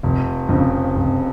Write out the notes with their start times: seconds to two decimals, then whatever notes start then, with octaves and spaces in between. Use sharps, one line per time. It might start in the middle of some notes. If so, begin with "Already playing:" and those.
0.03 F1
0.49 F2 C#3
0.96 F1